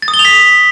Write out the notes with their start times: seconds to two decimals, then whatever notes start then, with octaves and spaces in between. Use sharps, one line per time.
0.02 A6
0.08 D#6
0.14 G7
0.19 F7
0.25 B6